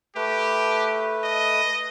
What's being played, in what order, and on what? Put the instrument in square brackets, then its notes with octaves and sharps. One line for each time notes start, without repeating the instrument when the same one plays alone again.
[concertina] A3 B4 [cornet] G4
[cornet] D#5